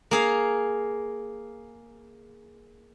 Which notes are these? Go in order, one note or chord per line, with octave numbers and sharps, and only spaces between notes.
A#3 G#4 F5